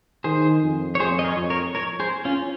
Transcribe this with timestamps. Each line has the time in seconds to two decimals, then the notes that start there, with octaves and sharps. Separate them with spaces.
0.24 D#3 G#4 C5
0.62 F2
0.95 C#5
1.00 F2 G#4 C5
1.19 D#5
1.25 A#4 C#5
1.37 F2
1.50 A#4 C#5
1.75 A#4 C#5
2.00 G#4 C5
2.25 C#4 F4